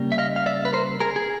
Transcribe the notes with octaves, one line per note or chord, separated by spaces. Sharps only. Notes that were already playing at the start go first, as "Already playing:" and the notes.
Already playing: C#3 G3 A#3
E5
D#5 F5
F5
D5 E5
B4
A#4 C5
G#4 A#4
G#4